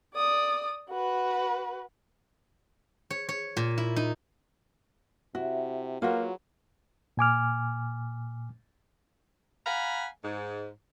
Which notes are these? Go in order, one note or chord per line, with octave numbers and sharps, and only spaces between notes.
D5 D#6
F#4 B4
C#5
C#5
A#2
E4
D#4
C3 E4 F#4
F#3 A#3 F4 F#4 G#4 B4
A#2 G#5 D6 F6
F5 F#5 G#5 A#5 B5
G#2